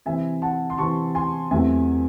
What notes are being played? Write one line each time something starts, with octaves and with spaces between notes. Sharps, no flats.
C3 E3 C4 E5 G#5
F#5 A5
C6
C3 E3 C4 A5 C#6
G#5 C6
E2 C3 F#3 A3 C4 E5 G#5